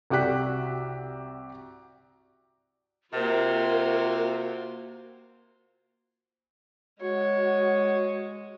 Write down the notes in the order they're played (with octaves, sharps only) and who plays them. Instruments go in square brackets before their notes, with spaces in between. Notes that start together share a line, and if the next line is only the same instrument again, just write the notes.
[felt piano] C2 F#4 G4 D5 F#6 B6
[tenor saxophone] C3 [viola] A#3 C5 [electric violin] F4 F#4 [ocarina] A#4
[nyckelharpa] G#3 [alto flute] F#4 [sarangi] C#5